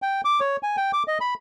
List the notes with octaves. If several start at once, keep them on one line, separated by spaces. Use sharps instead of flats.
G5
D6
C#5
G#5
G5
D6
D#5
B5